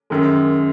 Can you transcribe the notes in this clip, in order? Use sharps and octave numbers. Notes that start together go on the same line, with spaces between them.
F#2 D#3 G#3